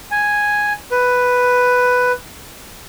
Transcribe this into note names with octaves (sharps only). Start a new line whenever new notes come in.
G#5
B4